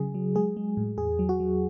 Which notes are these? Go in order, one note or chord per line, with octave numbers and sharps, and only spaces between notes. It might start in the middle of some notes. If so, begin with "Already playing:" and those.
Already playing: C#3 F#3 G#4
F#3
G#3 G#4
G#3
A2
E2 G#4
F#3
F#4
F#3